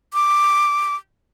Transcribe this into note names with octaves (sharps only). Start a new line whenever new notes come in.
D6